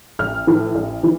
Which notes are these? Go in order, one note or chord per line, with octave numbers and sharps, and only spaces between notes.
A1 F6
A2 E3
A1
E3